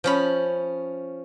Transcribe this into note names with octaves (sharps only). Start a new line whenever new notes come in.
F3 C#4 B5